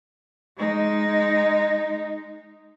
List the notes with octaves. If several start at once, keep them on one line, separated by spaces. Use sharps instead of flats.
G#3 D#4